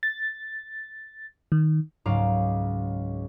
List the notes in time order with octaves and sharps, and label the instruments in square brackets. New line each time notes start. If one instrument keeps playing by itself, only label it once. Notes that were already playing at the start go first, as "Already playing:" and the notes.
[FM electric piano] A6
D#3
[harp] C#2 G#2 F#3 F5 A#5 D6